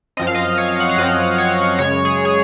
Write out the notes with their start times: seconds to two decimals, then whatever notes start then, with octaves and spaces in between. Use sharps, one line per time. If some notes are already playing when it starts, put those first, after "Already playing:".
0.17 F#2 F3 C4 D#5
0.27 F5
0.35 D#5
0.58 C#5
0.80 F#5
0.89 F5
0.98 F#2 F3 C4 D#5
1.38 C#5
1.79 F#2 C#3 G#3 C#5
2.05 G#4
2.25 G#4